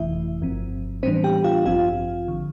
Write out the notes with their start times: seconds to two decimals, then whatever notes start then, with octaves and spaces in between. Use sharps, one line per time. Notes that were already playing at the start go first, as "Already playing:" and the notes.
Already playing: G1 F2 C3 E3 A3 E4 E5
0.41 G1 G2 F3 C4
1.03 A2 E3 G3 B3 C4 D4 C5
1.24 G4 G5
1.44 F4 F5
1.66 A1 G2 F3 C4 F4 F5
2.28 D3